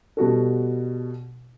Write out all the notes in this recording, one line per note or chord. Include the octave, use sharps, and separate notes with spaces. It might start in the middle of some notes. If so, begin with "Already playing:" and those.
B2 G3 F#4 A4